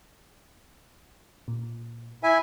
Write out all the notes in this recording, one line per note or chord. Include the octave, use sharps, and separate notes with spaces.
A#2
E4 E5 G#5